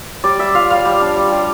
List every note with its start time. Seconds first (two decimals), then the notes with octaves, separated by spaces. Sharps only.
0.24 G3 D5
0.39 G3 E5
0.55 F4 F5
0.70 G3 F5
0.85 G3
1.01 D4
1.16 G3
1.32 G3